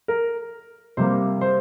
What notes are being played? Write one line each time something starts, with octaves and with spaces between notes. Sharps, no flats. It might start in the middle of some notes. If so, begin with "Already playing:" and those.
A#4
C3 G3 A#3 C5
C5